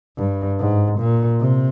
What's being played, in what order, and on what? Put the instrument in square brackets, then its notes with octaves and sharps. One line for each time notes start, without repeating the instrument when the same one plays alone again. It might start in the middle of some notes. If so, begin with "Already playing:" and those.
[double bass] G2
G#2
A#2
C3